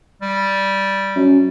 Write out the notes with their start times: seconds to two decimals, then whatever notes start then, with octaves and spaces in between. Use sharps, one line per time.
0.21 G3
1.16 F#2